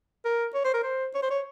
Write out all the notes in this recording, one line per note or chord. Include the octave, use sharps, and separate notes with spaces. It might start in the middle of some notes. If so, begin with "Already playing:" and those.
A#4
C#5
C5
A#4
C5
C#5
C5
C#5